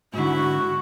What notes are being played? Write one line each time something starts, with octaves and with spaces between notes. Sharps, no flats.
G#2 D3 E4 F#4